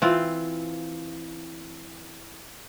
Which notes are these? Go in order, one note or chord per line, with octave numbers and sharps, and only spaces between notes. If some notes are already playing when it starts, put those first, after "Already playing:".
E3 C4 F4